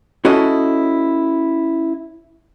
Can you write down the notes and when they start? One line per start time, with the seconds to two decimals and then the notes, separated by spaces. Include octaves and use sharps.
0.25 C#4 E4 F#4 A4 D#5